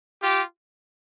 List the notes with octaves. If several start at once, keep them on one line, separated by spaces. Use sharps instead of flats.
F4 G4